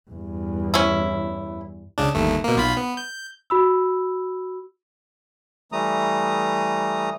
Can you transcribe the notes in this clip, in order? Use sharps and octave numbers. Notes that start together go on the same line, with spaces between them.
E2 G2
C#4 E4
C#2 C#3 D4
G1 D#2 A3
B2 A#3
B1 F4 B5
B3
G6
F#4 B5 E6
E3 G3 A3 A#5 D#6